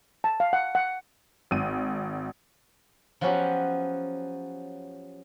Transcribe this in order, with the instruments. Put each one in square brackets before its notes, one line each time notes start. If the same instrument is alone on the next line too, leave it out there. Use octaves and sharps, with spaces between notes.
[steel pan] A5
F5
F#5
F#5
[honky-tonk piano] G#1 D#7
[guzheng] F3 F#3 B3 C#4 F#4 G4